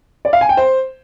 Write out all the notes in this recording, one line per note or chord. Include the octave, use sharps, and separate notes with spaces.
D5
F5
G#5
G5
C5